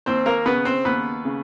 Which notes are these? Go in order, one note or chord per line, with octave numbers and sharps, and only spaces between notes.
D#2 C4 C5
A#3 A#4
C#3 B3 B4
C4 C5
D#2 B3 B4
C#3